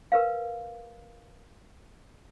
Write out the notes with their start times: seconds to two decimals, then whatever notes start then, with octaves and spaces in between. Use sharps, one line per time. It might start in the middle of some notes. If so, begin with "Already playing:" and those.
0.12 A#4 B4 F5